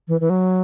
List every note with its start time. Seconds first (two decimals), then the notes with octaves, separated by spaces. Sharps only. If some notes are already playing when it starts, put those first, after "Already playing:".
0.08 E3
0.21 E3
0.30 F#3